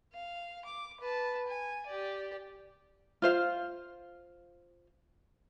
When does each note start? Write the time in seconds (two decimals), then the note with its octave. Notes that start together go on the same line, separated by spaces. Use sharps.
0.13 F5
0.65 D6
1.00 B4 A5
1.47 G#5
1.87 G4 D5
3.22 F4 C5 F5